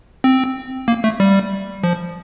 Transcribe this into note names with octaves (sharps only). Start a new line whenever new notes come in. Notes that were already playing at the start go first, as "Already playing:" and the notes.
C4
A#3
A3
G3
F3